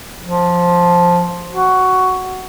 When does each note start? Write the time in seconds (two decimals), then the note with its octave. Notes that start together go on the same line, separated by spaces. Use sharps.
0.22 F3
1.52 F#4